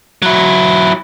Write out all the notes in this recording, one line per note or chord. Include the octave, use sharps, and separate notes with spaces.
F#3 E4